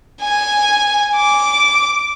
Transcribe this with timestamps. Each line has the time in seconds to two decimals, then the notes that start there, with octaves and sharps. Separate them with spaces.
0.21 G#5
1.16 D6